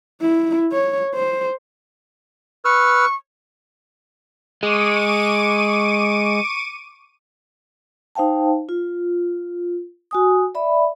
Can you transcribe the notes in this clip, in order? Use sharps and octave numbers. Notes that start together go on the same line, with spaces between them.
E4
C#5
C5
B4 C#6 E6 F6
G#3 C#6 D6 D#7
D#4 C5 F5 G5 A5
F4
F#4 G#5 D#6
D5 E5 B5